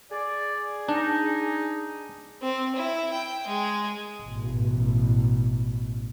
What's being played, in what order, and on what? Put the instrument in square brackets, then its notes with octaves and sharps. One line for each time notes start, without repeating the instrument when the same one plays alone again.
[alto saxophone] G#4 [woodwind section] D5
[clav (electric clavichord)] D4 [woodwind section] D#4
[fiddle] C4
E4
G5
G#3
[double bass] A1 B2